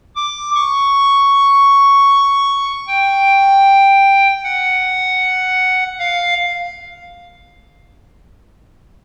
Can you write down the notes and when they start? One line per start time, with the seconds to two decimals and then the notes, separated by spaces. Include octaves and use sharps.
0.16 D6
0.55 C#6
2.88 G5
4.44 F#5
5.99 F5